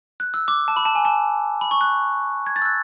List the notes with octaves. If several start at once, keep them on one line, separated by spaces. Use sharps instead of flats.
F#6
E6
D6
A5
B5
A5
G#5
A5
B5
C#6
F#6
G#6
A6
E6
F#6